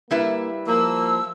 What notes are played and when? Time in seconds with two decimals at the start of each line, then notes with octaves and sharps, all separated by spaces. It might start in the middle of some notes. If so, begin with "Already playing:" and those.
0.11 G3 A#3 E4 B4
0.68 F3 A#3 E6